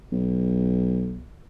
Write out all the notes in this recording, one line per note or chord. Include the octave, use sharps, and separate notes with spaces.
B1